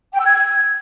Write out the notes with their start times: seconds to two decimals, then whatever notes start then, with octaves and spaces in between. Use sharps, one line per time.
0.13 G5
0.19 E6
0.26 G#6